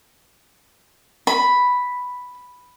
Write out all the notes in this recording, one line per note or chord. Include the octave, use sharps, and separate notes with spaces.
B5